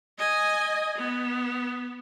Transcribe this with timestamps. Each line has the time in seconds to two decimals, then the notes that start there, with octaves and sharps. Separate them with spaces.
0.18 D#5 G#5
0.98 B3